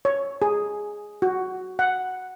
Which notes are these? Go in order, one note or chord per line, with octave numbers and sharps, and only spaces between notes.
C#5
G#4
F#4
F#5